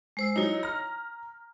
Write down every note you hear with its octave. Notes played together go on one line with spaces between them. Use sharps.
G#3 C5 E6
F#3 D#4 E4 C#5
A#5 F6 A#6